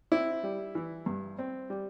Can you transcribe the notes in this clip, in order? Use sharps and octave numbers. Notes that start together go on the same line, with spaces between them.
C4 E4
G3
E3
G2
C4
G3